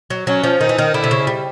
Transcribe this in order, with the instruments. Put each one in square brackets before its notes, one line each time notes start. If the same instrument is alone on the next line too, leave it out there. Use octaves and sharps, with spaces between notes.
[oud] F#3
[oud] F#3 [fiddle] C#4
[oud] F3
[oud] D#3 [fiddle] D#4
[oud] E3
D#3
[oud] D3 [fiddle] E4
[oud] C3
C#3
G3